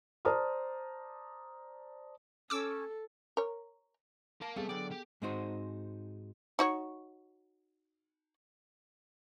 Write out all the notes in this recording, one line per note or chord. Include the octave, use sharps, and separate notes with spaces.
C5 D5 A5 A#5 D#6 F6
C#4 A4 D6 E6
A#4 C#5
A#4 F5 A5
G3 A3 B3 C4 G#4 A4 F5 A5
D3 F#3 D5 G5
G4
G#2 G#3 C4 D#4 F#4 C5
D#4 F#4 C#5